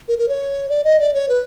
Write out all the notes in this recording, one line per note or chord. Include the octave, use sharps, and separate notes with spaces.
A#4
A#4
C#5
D5
D#5
D5
C#5
B4